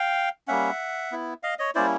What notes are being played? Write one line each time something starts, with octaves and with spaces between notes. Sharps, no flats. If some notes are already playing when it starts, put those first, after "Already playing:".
Already playing: F5 G5
G3 A#3 C#4 E5 F#5
B3 E4
D#5 F5
C#5 D#5
G3 A#3 C#4 E4 C5 D5